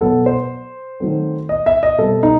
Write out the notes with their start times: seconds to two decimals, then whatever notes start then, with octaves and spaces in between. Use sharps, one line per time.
0.01 B2 F#3 B3 A4
0.26 C5
1.00 D#3 F#3 A3 C4
1.49 D#5
1.66 E5
1.83 D#5
1.98 B2 G3 C4 A4
2.23 D#4